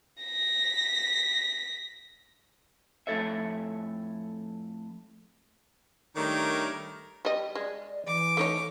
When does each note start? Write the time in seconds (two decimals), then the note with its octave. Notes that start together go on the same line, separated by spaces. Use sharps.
0.24 A#6 B6
3.07 F2 A2 A3 A4 C#5 E5
6.16 D#3 G3 A3 D4 A#4 C#5
7.25 G3 D#5
7.55 G#3 D5
8.06 E3 D6
8.37 A3 D#4 C#5